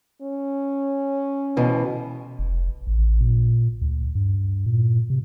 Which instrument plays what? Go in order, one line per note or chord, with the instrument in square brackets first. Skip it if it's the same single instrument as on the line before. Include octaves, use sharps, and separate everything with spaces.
[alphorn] C#4
[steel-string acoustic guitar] D2 B2 E3
[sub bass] F1
A1
A#2
D2
G2
A#2
C3